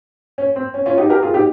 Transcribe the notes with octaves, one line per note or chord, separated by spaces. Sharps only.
C#4
C4
C#4
C#4 F4
D#4 G4
G4 A#4
F4 G#4
D#4 G4